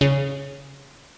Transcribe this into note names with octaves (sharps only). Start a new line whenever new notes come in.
C#3